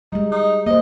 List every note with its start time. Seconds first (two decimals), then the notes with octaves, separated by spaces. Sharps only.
0.12 G3 G#3 D#4
0.32 D#4
0.66 A#3 C5 D#5